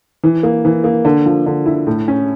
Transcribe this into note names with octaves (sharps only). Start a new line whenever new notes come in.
E3
A#3
E3
A#3
D3
F3
D3
E4
A2
C#4